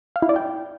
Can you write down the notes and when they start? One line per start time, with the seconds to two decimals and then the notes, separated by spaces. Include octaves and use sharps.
0.16 F5
0.22 E4
0.29 D5
0.36 G5